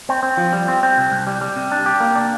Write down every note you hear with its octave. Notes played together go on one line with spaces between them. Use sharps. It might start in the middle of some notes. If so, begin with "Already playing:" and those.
C4
C4
F3
G3
C4
C4
C2
C2
G3
G3
C3
D4
G4
A#3
D4